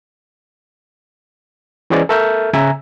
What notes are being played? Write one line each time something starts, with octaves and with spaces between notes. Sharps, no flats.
E3 C#4 G#4 C5 D5 D#5
A4 A#4 E5 F6 G6
C#3 E5 G#5 A#5